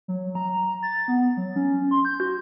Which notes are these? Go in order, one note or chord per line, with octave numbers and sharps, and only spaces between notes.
F#3
A#5
A6
B3
F#3
C#4
C6
G6
F#4